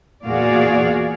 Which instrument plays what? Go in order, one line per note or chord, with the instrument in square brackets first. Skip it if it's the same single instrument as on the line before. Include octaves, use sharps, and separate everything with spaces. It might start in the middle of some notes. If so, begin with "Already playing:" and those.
[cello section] E2 A#2 F#4 G#4 D5 F5